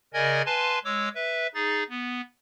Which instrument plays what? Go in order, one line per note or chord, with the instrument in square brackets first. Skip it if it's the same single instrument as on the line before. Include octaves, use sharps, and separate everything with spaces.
[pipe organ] C#3 A#4 D5 D#5 G#5 G#6
B4 F5 G#5 A5 C6
G#3 C#5 D6 E6
B4 E5
D#4 G#4 A6
B3